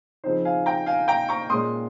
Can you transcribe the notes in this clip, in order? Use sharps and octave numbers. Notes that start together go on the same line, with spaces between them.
C#3 F3 C4 D#4 C5
F5 G#5
G5 A#5
F5 G#5
G5 A#5
A#5 C#6
A#2 G#3 C#4 C6 D#6